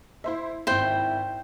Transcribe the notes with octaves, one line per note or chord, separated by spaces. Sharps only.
E4 C5 E5
G#1 E4 C5 G5